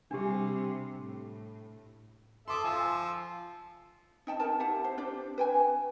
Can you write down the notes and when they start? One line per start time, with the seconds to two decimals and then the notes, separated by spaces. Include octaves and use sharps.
0.11 C3 G3 D4 G4
0.96 A2
2.48 A4 E5 C6 D6 D#6
2.64 F3 G#5 E6
4.27 D#4 G5 A5
4.40 D#4 A#4 A5
4.60 E4 G4 F#5 A5
4.84 C5
4.98 D4 G4 C5 D5
5.38 B4 G5 G#5